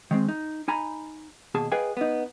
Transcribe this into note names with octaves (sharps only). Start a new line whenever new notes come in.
D#3 G#3 C4
D#4
D#4 G#5 A#5 B5
D#2 B2 G#4 A5
G#4 B4 D#5 F5 G5 G#5
B3 D#4